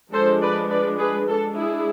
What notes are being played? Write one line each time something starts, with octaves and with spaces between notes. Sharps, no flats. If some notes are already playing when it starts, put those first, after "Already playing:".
F3 G#3 D4 A4 C5
B4 D5
B4 D5
G#4 B4
G#3 D4 F4 A4
E4 G#4